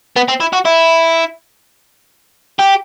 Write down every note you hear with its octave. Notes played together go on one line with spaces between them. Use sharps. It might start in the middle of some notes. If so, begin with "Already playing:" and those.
B3
C4
E4
F#4
E4
G4